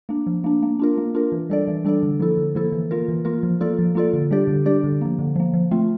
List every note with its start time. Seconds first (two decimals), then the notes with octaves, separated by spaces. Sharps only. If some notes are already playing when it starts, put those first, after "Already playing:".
0.09 A#3 D4
0.27 F3
0.44 A#3 D4
0.63 A#3
0.79 D4 F4 A#4
0.98 A#3
1.15 D4 F4 A#4
1.32 E3
1.50 G3 D4 A4 D5
1.68 E3
1.85 G3 D4 A4 D5
2.03 D3
2.20 F3 A#3 E4 A4
2.37 D3
2.55 F3 A#3 E4 A4
2.72 E3
2.91 A#3 F4 A#4
3.08 E3
3.25 A#3 F4 A#4
3.43 F3
3.61 A#3 F4 A4 D5
3.79 F3
3.95 A#3 F4 A4 D5
4.13 D3
4.31 G3 D4 G4 D5
4.48 D3
4.66 G3 D4 G4 D5
4.84 D3
5.01 F3 A#3
5.19 D3
5.36 F3 A#3
5.54 F3
5.71 A3 C4 F4